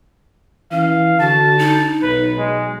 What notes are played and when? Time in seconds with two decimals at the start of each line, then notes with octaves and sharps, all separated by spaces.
0.72 E3 C#4 F5
1.20 D3 F#4 A5
1.59 D#4
2.03 B1 B4
2.38 G#3